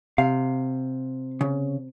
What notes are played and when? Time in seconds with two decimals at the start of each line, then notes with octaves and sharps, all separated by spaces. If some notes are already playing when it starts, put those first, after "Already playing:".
0.18 C3 F5
1.41 C#3